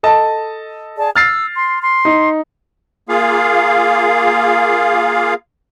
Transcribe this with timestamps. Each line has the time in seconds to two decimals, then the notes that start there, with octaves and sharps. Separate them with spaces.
0.03 A4 D#5 A5
0.98 G#4 D5 A5
1.16 E6 F6 A6 C7
1.56 C6
1.82 C6
2.05 D#4
3.09 A#3 F4 G#4 F5